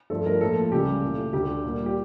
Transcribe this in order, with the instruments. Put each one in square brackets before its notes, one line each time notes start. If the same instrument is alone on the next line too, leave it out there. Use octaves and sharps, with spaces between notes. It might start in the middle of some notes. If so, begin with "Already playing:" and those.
[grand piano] G2 F3 A3 A4
A#4
A2 F3 A#3 A4
C#2 C#3 E3 G3 G4
A#2 A3
D2 D3 A3 G4
A#2 G3 A#3
G4